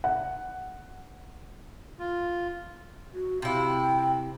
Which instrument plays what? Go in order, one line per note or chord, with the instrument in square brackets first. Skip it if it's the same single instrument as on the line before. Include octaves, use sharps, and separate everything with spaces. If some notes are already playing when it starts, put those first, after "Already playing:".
[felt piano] F#5
[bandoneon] F4
[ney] F#4
[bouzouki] C3 E4 [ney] F5
[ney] G5